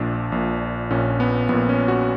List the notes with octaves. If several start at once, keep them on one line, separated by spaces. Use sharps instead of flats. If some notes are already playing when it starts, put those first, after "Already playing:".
Already playing: A#1 A#2 D4
A#1 A#2
A#1 A#2 C#4
B3
A#1 A#2 B3
C#4
F#4